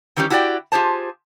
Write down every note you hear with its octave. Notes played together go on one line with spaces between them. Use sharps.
D#3 E3 G3 C#4 G4
E4 F#4 G4 A4 D5 G5
F4 G4 G#4 C5 A5